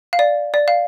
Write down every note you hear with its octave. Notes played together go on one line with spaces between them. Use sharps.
F5
D5
D5
F5